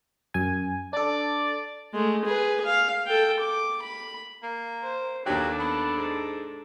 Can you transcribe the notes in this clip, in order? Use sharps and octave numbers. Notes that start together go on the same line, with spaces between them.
F#2 G#5
D4 A4 D5
G#3 A3
G#4 B4
F5
A4 G5
D6
B5
A#3
C5
D#2 F#3 D4 G4 A4
B3
G#2